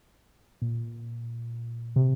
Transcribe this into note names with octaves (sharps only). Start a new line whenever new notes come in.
A#2
C3